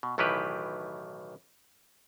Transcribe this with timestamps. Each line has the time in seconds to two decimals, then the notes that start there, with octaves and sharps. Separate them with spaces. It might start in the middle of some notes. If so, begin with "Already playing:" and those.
0.03 B2
0.18 B1 A2 D#3 E3 G4 B4